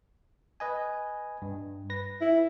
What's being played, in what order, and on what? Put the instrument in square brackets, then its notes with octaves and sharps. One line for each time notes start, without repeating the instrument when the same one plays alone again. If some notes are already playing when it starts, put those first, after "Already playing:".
[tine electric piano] B4 D#5 G#5
G2
B4 A#6
[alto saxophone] E4